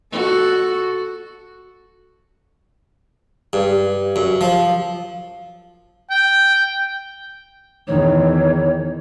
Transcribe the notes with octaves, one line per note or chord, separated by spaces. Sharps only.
F#4 A4
G2
F#2
F3
G5
E2 D#3 C#5